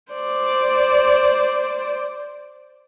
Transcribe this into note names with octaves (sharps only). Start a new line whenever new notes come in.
C5 D5